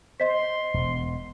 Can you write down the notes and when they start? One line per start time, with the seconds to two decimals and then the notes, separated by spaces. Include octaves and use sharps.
0.20 C5 D#5 C6 B6
0.74 E1 B2